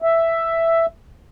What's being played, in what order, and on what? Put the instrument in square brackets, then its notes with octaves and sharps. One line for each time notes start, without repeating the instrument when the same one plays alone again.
[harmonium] E5